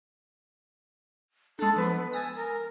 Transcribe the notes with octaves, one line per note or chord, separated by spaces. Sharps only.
G#3 D4 A4
F3 G#3 B3 B4
G#5 D#6 E6 A6
A#4